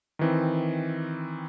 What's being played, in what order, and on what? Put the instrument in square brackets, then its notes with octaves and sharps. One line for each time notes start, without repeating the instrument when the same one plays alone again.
[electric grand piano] D#3 E3 C4